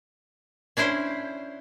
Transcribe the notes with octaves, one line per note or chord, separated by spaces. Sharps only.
C#4 D4 E4 C5